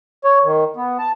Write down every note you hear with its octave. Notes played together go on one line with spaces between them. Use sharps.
C#5
D#3
B3
A5